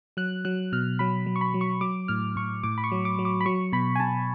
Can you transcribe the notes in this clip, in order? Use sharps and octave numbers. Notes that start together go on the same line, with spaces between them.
F#3 F#6
F#3 F#6
B2 F6
F#3 B5
F#3
C#6
B5
F#3
C#6
F#3 D6
A2 F6
A2 C#6
A2 D6
B5
C#6
F#3
D6
F#3
D6
B5
F#3 C#6
B2 B5
G#5
B2 A5